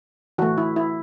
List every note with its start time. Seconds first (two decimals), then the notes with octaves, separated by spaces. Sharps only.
0.38 E3 A3 F#4
0.58 E4
0.76 E4